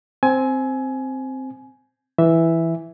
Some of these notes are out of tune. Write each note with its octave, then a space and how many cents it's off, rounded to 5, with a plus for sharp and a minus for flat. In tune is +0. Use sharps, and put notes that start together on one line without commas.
C4 +0 G#5 +20
E3 +0 E5 +0